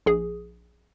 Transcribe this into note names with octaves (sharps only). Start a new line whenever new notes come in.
A#1 G#4